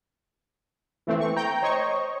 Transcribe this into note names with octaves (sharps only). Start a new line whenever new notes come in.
E3 A3 C4
C#6
G5 A#5 G6
C5 C#5 D#5 C#6